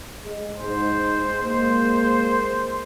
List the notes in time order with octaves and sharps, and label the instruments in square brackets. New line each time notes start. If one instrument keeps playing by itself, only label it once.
[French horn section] G#3
[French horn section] G#2 [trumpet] C5
[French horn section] G#3 A#3 [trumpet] C5